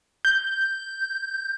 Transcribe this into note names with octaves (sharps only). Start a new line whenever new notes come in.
G6